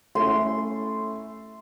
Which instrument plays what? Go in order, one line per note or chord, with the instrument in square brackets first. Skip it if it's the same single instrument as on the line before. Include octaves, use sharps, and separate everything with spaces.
[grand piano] A3 C#4 E4 [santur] C6